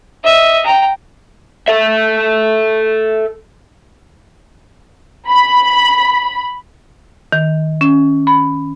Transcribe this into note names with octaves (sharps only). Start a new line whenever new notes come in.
D#5 E5
G5 A#5
A4 E5
B5
D#3
C#4
B5